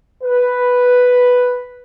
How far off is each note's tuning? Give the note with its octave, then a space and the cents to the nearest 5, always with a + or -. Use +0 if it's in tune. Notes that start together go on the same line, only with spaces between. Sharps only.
B4 +0